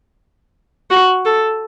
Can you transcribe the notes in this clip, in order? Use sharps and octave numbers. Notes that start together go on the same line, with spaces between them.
F#4
A4